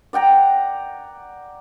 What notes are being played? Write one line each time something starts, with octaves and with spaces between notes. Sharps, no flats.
D5 F#5 G5 A#5